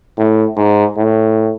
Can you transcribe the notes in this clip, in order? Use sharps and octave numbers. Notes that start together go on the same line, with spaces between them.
A2
G#2
A2